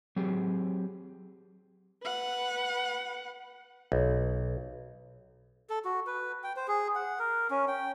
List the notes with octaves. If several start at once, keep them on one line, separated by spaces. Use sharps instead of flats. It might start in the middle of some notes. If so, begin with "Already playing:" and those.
F#3 C4 G4 G#4
B4 F#5
B1
A4
F#4
B4
G5
C5
G#4
F#5
A#4
C#4
G5